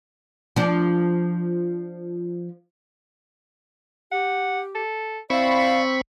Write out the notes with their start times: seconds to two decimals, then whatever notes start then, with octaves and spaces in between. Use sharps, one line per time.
0.56 F3 D4
4.12 G4 F#5
4.75 A4
5.30 C4 E4 D5 F5 B5 C#6